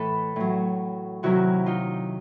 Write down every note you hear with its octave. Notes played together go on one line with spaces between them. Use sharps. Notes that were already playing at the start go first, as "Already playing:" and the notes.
Already playing: A2 E3 A4 B4
A2 F#3
C3 D#3 F#3 E4 F#4
D#4 F4